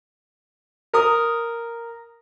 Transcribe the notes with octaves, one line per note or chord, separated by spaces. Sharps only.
A#4 D#6